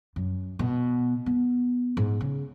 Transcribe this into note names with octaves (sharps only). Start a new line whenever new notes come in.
F#2
B2
B3
G#2
C#3